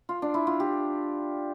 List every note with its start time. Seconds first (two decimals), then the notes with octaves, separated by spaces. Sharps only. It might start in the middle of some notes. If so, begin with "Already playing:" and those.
0.09 F4
0.22 D4
0.34 E4
0.47 F4
0.60 G4